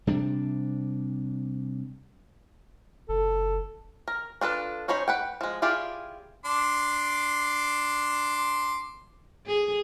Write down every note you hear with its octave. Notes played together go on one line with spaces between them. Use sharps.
C3 G3 D4
F#1 A4
A#4
D4 F4 A4 B4
C#4 D#4 C5 C#5 B5
B4 F#5 G5
F3 G#3
E4 F4 G4 G#4 D5
D4 C6 D6
G#4